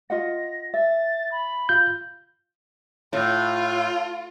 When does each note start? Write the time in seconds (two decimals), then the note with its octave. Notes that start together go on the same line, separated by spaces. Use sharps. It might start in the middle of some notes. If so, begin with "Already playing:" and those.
0.10 F4 D#5 F#5 A#6
0.74 E5 A6
1.31 B5
1.69 F4 G6
3.13 A2 F4